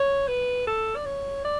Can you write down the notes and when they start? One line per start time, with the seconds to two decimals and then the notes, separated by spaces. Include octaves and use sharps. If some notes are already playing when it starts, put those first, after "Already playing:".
Already playing: C#5
0.28 B4
0.67 A4
0.96 D5
1.05 C#5
1.45 D5